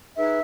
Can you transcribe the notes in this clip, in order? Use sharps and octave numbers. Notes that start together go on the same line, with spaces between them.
D#4 G#4 B4 E5